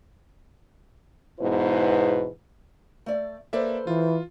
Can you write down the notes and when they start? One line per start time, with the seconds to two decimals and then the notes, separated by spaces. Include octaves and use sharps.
1.40 E2 G#2 B2 E4 B4 C5
3.06 A3 D5
3.53 A#3 A4 B4 C5 D5 E5
3.87 E3 F4